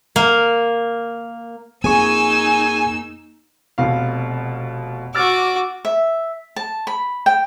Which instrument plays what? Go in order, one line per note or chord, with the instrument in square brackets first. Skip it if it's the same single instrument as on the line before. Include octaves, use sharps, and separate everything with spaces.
[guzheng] A#3
[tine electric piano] F2 G#4 C#6 [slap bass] A#3 [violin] D#4 E6 [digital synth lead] G#5
[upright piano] F1 B2 F5
[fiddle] F#4 D6 [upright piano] E6 F6 A6
[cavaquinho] E5
A5
B5
G5